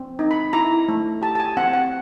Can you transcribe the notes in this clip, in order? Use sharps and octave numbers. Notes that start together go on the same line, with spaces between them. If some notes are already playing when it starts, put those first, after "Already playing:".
Already playing: C4
D#4
B5
E4 A#5
A3
G4 A5
A5
G#5
C4 F#5
F#5